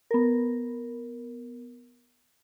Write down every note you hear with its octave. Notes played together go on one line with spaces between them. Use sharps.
B3 A#4